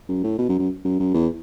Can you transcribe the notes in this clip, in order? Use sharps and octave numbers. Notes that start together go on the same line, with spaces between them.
F#2
A2
B2
F#2
F#2
F#2
F#2
E2